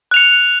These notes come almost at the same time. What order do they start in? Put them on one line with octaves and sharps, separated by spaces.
F#6 F7 C#7